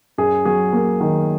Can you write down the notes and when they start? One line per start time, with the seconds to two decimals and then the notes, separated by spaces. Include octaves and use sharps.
0.18 F#2 G#4
0.45 F#3 G#4
0.73 A#3
1.00 D#3